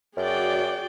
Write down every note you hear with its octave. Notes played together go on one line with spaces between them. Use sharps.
F#2 F#4 G#4 D5 G5